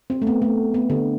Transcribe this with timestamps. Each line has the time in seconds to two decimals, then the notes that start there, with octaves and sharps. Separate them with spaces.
0.10 C4
0.22 A3
0.27 B3
0.42 A3
0.74 B3
0.90 D3